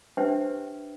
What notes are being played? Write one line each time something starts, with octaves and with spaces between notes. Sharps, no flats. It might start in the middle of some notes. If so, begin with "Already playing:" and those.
D4 G4 B4 C5 E5 G5